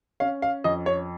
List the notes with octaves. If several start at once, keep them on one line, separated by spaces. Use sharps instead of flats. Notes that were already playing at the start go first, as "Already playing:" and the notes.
C#4 F5
F5
F2 D#5
C#5